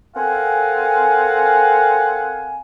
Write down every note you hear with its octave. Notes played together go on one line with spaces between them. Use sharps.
C4 A4 A#4 F5 F#5 G#5